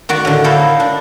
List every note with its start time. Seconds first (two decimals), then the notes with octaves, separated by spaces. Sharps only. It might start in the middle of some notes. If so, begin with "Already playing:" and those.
0.09 D#3 F#4 D5
0.25 A2 D3
0.44 A#3 D#4 E4 A4 C5 F5
0.80 D4